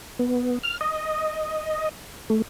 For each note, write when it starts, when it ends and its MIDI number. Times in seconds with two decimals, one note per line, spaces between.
0.19 0.58 59
0.63 0.78 89
0.81 1.89 75
2.30 2.42 57